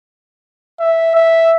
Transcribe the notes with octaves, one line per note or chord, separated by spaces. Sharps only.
E5
E5